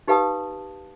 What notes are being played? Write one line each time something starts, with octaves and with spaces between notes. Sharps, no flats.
D#4 G4 B4 F5 A5 D#6